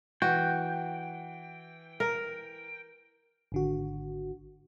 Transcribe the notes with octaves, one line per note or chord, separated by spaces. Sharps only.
E3 F#4 G5
A#4
G#1 D3 F#4